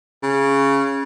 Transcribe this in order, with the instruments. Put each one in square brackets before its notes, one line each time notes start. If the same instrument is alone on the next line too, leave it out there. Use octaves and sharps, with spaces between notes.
[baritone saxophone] C#3